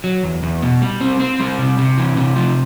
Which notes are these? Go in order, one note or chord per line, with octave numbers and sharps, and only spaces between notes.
F#3
E2
E2
B2
G3
C4
C4
G3
C3
C3
E3
C3
F3